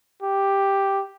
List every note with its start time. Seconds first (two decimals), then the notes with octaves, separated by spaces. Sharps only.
0.22 G4